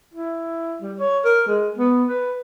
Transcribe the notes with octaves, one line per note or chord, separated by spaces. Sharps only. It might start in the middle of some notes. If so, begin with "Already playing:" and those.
E4
G3
C#5
A#4
G#3
B3
B4